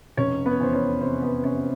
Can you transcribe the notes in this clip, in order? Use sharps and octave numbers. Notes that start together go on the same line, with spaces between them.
F1 C#4 C#5
B3 B4
E2 C5
C#4 C#5
C3 C4 C5
B3 B4
C3 C#4 C#5